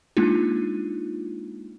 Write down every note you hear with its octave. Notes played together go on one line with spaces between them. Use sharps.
G#3 A#3 D4 D#4 F4